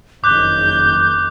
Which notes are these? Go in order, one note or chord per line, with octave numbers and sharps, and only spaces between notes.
F#1 F2 D#3 D6 F#6 G6